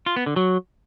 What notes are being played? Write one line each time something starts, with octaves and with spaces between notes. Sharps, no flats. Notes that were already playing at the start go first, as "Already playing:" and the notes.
F4
B3
D3
F#3